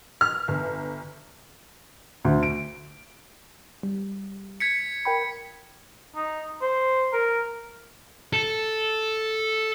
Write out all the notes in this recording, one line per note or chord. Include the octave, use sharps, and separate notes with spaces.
F6
G1
D2
D7
G3
G#6 B6 C#7
A#4 G5 B5
D#4
C5
A#4
A4